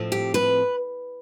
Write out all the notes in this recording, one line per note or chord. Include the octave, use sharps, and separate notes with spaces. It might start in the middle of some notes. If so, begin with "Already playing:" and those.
Already playing: A2 F3 C4
G4
B4